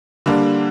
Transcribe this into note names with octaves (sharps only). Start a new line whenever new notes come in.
D3 G3 A#3 D4